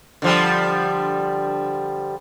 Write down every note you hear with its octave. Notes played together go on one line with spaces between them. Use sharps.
D3 F3 G3